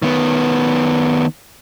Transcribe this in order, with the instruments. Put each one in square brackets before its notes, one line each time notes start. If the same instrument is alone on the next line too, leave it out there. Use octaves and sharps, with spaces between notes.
[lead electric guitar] D#3 B3